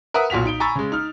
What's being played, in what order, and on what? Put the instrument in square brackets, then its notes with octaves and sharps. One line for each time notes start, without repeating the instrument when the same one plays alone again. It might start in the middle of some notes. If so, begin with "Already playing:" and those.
[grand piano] A#4 B4 E5 F#5 D#6
B1 A#2 F#4 B6 F7
D#4 D7 G7
G#5 A#5 B5 C#6 E6 A6
C#3 G#3
D#4 F6